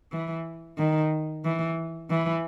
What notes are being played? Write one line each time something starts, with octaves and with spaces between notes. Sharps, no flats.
E3
D#3
E3
E3